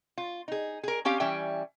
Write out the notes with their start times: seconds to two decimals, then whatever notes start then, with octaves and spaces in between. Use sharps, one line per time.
0.18 F4
0.48 D#4 G#4
0.83 G#4 A#4
1.05 C4 C#4 G4 F5
1.20 E3 G3 C#4 E5 G5